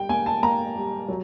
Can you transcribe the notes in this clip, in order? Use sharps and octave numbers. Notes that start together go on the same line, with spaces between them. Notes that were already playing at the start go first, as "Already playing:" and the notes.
Already playing: G3 G5
A#3 G#5
A5
A#3 A#5
G3
F#3